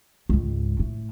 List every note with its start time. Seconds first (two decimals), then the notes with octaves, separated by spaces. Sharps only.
0.29 C#2 G#2
0.79 A2